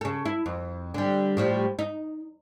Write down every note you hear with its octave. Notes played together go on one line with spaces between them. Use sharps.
C#3 A4
E4
F2
D3 G3
A2 F3 G3
D#4